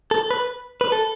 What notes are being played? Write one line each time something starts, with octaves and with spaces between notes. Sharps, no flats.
A4
B4
B4
A4